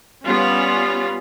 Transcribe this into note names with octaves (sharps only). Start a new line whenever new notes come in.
G3 B3 C#4 F4